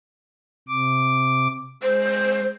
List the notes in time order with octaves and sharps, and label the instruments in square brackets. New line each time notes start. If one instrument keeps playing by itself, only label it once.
[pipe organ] C3 D6
[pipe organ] G#3 [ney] C5